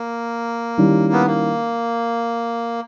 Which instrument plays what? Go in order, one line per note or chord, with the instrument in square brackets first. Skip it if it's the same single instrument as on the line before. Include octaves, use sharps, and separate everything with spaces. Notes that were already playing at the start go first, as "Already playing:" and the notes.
Already playing: [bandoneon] A#3
[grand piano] D#3 G3 C#4 E4
[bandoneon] B3
A#3